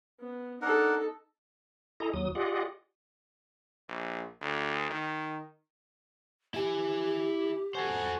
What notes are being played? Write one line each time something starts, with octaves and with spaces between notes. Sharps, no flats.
B3
D4 D#4 A4 A#4 F#5
E4 G#4 A4 D#5 A#5
D#2 F#3 D#6
F4 G4 G#4 D5 D#5 F#5
A#1
D2
D#3
E4 G4 G#5
F#4 A4 C5 G#5